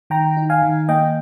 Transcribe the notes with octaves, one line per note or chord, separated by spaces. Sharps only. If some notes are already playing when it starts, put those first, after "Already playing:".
D#3 G5 A#5
D#4
F5 G#5
D#3
A#3 D#5 G5